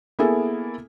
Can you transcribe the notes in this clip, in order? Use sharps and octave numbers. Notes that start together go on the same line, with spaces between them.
A#3 B3 E4 G#4 A4